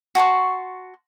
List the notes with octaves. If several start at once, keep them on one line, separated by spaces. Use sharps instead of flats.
F#4 A5 C6 C#6